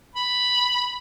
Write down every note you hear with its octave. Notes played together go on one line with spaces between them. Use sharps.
B5